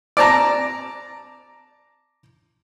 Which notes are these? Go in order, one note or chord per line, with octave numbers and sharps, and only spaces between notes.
D5 A5 A#5